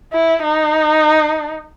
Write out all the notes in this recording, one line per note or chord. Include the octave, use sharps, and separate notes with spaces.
E4
D#4